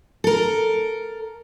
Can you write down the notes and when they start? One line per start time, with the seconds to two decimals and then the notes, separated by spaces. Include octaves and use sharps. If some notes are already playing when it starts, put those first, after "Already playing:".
0.24 A4 A#4